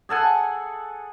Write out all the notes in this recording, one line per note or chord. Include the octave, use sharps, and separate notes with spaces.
G#4 A4 F#5 G#5